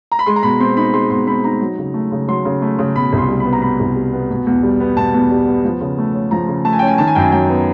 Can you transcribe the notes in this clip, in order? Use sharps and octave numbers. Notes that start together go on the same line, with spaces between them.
A#5
B5
G#3 C6
A#5
B2 B5
C4 C6
D#4 B5
G#3 C6
B2 C6
C4 B5
D#4 A#5
F#3
C#3
A3
C#3
F#3 C6
C#3
A3
C#3
B2 B5
C2
C6
G3
B5
B3
A#5
B2 B5
C2
G3
B3
B2
E2
G3
B3
B2 A5
E2
G3
B3
F3
C#3
A3
C#4
F3 A#5
C#3
A3 A5
G#5
G5
C#4
G#5
D#3 A5
G#5
F#2 G5
G#5
F#3 G5
B3